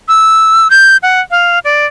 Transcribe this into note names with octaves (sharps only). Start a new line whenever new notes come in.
E6
G6
F#5
F5
D5